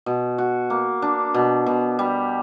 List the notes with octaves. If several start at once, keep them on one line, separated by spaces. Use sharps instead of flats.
B2
F#4
A#3
D4
B2
B2
G3